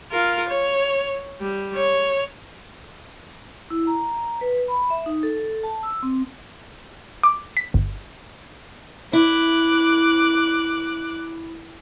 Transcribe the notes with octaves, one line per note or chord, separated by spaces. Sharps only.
F4 A#4
C#5
G3
C#5
E4
A#5
B4
B5
E5
D#4
A4
A5
E6
C4
D6
B6
G1
E4 D6 F#6